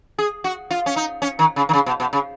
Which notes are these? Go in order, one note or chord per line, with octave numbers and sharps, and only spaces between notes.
G#4
F#4
F4
C#4
D#4
C#4
D#3
C#3
D#3
C#3
B2
B2
C#3